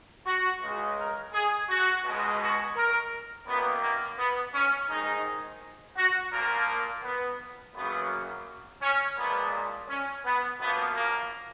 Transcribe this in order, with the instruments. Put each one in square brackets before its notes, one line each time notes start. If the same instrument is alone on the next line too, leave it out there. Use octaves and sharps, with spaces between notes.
[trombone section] F#4
C#2 C#3 G#3
A#4
G#4
F#4
C#2 B2 G#3
F#4
A#4
F#2 D#3 A#3 B3
A#3
B3
C#4
G#2 D#3 G#3 D#4
F#4
A#2 F3 A#3 A#4
B3
F#2 C#3 F#3 A#3 B3
C#4
A#2 F3 G#3 B3
C#4
B3
F#2 F3 A#3 B3
A#3